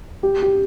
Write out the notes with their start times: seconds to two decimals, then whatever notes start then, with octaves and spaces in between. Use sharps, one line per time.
0.23 G4
0.42 G4